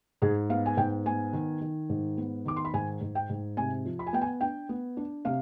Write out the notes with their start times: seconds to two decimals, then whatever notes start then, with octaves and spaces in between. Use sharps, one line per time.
0.22 G#2 G#4
0.50 B3 F5
0.66 G#5
0.77 G#2 G5
1.06 B3 G#5
1.33 D#3
1.61 D#3
1.90 G#2
2.17 B3
2.45 D#3 D6
2.56 C6
2.65 B5
2.74 G#2 G#5
3.01 G#2
3.15 G5
3.29 G#2
3.57 C3 G#5
3.86 F3
3.99 B5
4.07 G#5
4.13 B3 G5
4.21 G#5
4.41 D4 G5
4.69 B3
4.97 D4
5.25 C3 F5